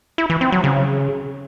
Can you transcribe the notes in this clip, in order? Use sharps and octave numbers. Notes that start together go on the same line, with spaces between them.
E4
E3
C4
F#3
C#3